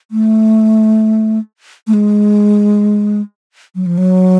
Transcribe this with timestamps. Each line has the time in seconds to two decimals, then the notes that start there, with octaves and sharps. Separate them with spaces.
0.11 A3
1.87 A3
1.93 G#3
3.75 F#3
3.86 F3
3.98 F#3